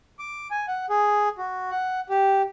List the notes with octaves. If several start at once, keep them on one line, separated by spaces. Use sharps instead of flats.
D6
G#5
F#5
G#4
F#4
F#5
G4